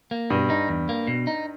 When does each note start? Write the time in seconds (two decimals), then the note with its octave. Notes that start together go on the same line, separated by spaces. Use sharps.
0.11 A#3
0.30 G2 B2
0.50 D#4
0.69 E2
0.89 A#3
1.08 B2
1.27 D#4